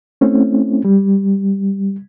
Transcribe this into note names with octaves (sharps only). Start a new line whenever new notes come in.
A3 C4 C#4 E4
G3